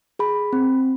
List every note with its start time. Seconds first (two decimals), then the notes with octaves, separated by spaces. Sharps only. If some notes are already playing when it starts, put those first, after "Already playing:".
0.19 G#4 B5
0.53 C4